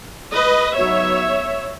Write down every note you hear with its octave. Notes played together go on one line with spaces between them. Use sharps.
B4 D#5
F#3 B3 D#4 C#5 E5